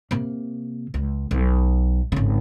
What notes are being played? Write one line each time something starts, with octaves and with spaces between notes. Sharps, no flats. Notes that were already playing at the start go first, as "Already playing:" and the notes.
C3 A#3
C#2
B1
G#1 C#3